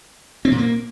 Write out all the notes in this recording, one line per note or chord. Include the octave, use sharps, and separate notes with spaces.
C4
A#2
A#3